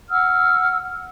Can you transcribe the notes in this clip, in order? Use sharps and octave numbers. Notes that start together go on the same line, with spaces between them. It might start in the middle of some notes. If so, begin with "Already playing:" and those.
F#5 E6 F6